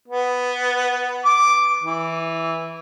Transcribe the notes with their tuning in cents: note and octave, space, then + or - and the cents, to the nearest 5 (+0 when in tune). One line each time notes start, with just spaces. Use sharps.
B3 +5
D6 +0
E3 -5